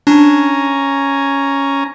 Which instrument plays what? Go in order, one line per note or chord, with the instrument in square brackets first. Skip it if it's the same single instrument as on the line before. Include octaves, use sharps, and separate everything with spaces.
[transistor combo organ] C#4 G#5 A#5 [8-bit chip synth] D4